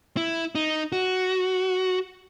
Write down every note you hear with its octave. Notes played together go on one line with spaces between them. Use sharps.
E4
D#4
F#4